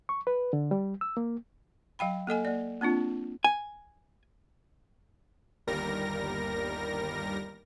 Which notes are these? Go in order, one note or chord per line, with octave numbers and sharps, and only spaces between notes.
C#6
B4
D3
G3
E6
A#3
F#3 F5 G5 B5
A#3 A4 D#5 G#5
A#3 D5
A#3 C4 D4 F4
G#5
G1 D#2 G3 A#4 A#6